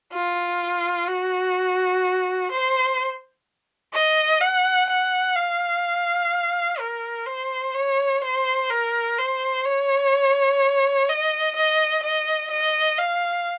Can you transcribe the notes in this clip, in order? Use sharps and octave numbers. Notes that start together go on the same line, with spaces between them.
F4
F#4
C5
D#5
F#5
F#5
F5
A#4
C5
C#5
C5
A#4
C5
C#5
D#5
D#5
D#5
D#5
F5